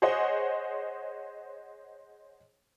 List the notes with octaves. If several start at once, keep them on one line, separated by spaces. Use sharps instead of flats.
G#4 C5 C#5 D#5 F#5